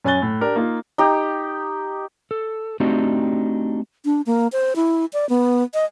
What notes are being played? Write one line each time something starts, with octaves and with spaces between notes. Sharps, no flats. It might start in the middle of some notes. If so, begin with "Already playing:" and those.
F#2 C#4 G#5 F#6 A6 G7
A2
D4 G4 A#4
A#3 D#4 F4
D#4 G4
A4
A3 C4 D4 D#4 F#4 G4
D4
A#3
C5
E4
D5
B3
D#5